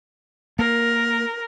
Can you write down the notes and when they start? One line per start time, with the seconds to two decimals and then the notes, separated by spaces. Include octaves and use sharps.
0.59 A#3 A#4